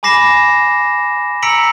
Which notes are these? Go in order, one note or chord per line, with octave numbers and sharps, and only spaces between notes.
G#5 B5 D6 A#6 C7 E7
A#5 E6 B6 C#7 D7 F#7